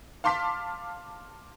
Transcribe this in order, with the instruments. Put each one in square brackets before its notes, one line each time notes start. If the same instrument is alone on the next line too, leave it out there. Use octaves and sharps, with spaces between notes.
[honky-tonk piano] F5 A5 C6 D6 F6 B6